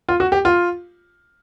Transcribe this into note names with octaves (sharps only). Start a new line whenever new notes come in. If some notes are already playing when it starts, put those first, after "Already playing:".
F4
F#4
G4
F4